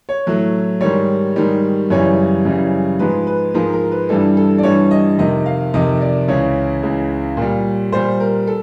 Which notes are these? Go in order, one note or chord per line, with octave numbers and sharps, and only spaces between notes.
C#5
A2 F#3 A3
G#2 D#3 G3 C#5
G#2 D#3 G3
F#2 C#3 E3 G3 C#5
F#2 C#3 E3 G3
G#2 F3 G#3 B4
B4
G#2 F3 G#3 A#4
A#4
B4
G2 E3 G3 A4
A4
D5
G2 E3 G3 C#5
D#5
F2 C3 D#3 D#5
F5
F2 C3 D#3 D#5
D5
C#2 C#3 E3 C#5
C#2 C#3 E3
A#2 G3
A#2 G3 C5
A#4
A4